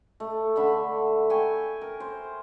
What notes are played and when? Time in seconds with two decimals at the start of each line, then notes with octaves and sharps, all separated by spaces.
0.20 A3
0.56 D3 E5 F#5 B5
1.30 G5 G#5 C#6
1.81 A#4
2.00 C5